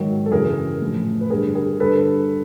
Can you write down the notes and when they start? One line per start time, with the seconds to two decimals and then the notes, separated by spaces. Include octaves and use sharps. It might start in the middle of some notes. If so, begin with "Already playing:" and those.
Already playing: G#2 D#3 F#3
0.26 A4
0.31 F#2 C#3 E3 G#4 A#4
0.81 A2 F3
1.21 B4
1.30 G2 D3 G3 G#4 A#4
1.55 G#4 A#4
1.79 G2 D3 G3 A4 B4